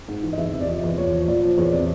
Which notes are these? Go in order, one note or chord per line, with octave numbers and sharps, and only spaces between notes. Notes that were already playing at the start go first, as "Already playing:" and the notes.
G#2
E3
D#5
E2 E5
C3
D5
F3 D#5
E2
A#2 C#5
F3
A#2 D5
F3
E2 C#5
C3 D5